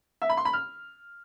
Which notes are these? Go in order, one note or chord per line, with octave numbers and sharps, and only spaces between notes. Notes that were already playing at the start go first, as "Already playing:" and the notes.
E5
B5
C6
B5
F6